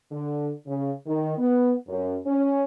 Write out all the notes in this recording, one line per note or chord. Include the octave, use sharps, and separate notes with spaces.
D3
C#3
D#3
B3
F#2
C#4